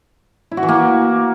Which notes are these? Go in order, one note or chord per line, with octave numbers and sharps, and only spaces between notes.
E4
F#4
E3
A#3